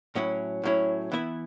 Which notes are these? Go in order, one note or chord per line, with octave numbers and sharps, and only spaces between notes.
A2 F#3 C#4 E4
A2 F#3 C#4 E4
E3 B3 E4 B4 E5